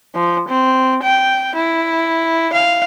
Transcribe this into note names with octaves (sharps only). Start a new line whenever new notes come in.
F3
C4
G5
E4
F5